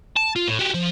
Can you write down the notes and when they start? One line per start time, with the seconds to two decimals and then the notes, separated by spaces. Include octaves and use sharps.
0.16 A5
0.36 F4
0.48 A2
0.59 F#4 G4
0.74 F3